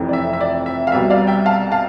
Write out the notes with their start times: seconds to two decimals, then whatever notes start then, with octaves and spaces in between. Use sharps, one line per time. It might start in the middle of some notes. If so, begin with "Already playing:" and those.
Already playing: F1 F2 E3
0.09 D5
0.13 E5
0.33 E5
0.41 D5
0.66 E5
0.87 F5
0.92 C2 B2 G3 E5
1.10 D5 F5
1.27 E5 G5
1.46 F5 A5
1.72 F5 A5